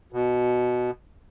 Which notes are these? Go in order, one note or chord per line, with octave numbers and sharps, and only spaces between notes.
B2